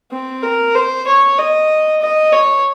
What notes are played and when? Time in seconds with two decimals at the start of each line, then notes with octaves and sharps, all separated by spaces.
0.12 C4
0.43 A#4
0.75 C5
1.07 C#5
1.38 D#5
2.01 D#5
2.33 C#5